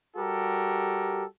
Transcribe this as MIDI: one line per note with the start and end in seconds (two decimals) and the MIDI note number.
0.16 1.23 55
0.16 1.23 66
0.16 1.23 67
0.16 1.23 69
0.16 1.23 70